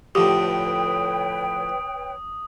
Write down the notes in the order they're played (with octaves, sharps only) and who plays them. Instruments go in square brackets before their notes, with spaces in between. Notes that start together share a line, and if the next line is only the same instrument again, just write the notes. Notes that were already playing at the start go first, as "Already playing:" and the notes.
[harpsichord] A2 D3 F3 [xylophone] G4 [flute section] B4 C#5 G5 [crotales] D#6